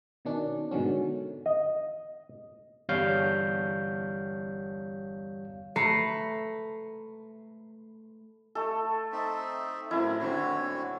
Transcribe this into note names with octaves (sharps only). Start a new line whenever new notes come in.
B2 D#3 C#4 D4
G#2 B2 D3 D#3 F#3 C#4
D#5
G1 E2 G3 C#5 F5 G6
A3 B4 A#5 C7 C#7
A3 A4
C4 D#4 E5
F#2 A2 C4 E4 A#4
D#1 D3 C4 F#4 C#5